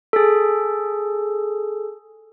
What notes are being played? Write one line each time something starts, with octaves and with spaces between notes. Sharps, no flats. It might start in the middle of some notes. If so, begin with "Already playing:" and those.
G#4 A4